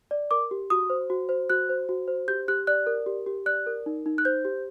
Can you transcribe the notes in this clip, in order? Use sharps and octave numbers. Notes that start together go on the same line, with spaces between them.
D5
A#4 D6
G4
F#4 D#6
C5
F#4
C5
F#4 F#6
C5
F#4
C5
G4 G6
G4 F#6
D5 F#6
A#4
G4
G4
D5 F#6
A#4
D#4
D#4
F#6
C5 G6
G4